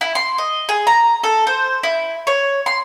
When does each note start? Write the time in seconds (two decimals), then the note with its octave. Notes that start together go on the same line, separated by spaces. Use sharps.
0.01 E4
0.15 C6
0.38 D#5
0.69 G#4
0.87 A#5
1.24 A4
1.47 C5
1.83 E4
2.27 C#5
2.66 C6